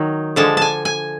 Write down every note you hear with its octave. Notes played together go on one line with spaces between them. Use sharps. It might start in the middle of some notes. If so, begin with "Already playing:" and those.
Already playing: D#3 F#3 D#4
D3 F3 G#3 A5
G#5 A5
G#5